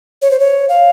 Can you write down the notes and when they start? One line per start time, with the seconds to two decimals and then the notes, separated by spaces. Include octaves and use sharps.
0.22 C#5
0.31 C5
0.40 C#5
0.69 F5